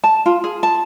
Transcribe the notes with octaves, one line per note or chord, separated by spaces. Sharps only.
A5
F4
G#4
A5